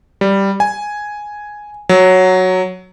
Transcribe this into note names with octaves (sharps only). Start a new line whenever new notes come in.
G3
G#5
F#3